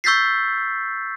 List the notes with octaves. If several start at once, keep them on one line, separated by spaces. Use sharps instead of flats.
C#6 E6 G6 A6 B6 C7